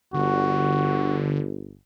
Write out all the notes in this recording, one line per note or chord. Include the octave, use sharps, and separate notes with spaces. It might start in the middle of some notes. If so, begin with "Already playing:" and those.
G1 D3 F#4